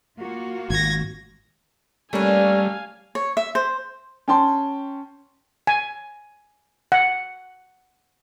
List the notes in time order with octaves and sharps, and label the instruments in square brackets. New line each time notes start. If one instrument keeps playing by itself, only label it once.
[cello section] A#3 F4 F#4
[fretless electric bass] G#1 [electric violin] G#6 A#6
[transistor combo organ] G3 [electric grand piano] A3 A#3 C#4 [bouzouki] D4 B4 [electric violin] F5 G#5
[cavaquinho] C#5
E5
C5
[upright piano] C#4 G5 A5 C6
[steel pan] G#5
F#5